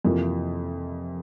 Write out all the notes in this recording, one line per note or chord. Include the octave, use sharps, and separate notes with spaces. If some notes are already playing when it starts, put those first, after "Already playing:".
F2 C3 E3 A#3 F4